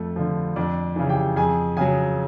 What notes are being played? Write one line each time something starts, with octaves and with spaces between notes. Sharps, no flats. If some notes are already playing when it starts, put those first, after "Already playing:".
Already playing: F2 A3 A4
D3 F3
F2 D4 D5
C#3 E3
G4 G5
F2 G#4 G#5
C#3 F#3 G#4 G#5